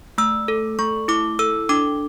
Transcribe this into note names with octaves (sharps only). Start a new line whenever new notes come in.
A3 E6
A4
A3 C#6
E4 D6
A4 E6
D4 D6